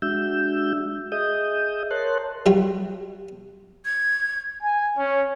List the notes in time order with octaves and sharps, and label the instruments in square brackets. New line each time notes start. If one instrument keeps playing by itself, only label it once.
[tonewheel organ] G#3 D4 F#4 E5 E6 G6
G#4 D#5 E5 D#6 G6
A#4 C#5 A5 C6 F#6
[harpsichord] F#3 G3 F4 C#5
[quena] G#6
[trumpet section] G#5
C#4